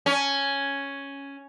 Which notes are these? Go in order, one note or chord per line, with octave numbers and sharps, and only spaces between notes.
C#4